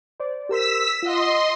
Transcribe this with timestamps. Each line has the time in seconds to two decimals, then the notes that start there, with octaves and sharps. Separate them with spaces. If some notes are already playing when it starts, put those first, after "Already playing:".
0.20 C5 D5
0.49 G4 A#4 C5 E6 B6
1.02 F4 D#5 F#5 C6